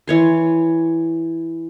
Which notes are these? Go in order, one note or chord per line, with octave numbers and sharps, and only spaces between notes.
E3 C#5 C6